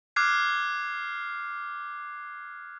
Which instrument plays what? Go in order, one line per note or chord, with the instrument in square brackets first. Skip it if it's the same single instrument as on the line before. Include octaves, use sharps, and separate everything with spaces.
[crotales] D6 F6 F#6 G#6 C7